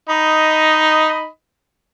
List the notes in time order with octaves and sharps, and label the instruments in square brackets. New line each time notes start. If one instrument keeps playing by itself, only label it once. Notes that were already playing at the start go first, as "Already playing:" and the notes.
[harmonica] D#4 D#5 B5